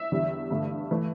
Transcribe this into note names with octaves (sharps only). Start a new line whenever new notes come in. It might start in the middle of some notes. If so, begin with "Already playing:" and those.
Already playing: E5
E2 D3 G3
G2 D3 A3
E3 A3